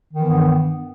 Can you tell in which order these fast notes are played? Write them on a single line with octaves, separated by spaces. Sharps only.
D#3 E3 B3 G2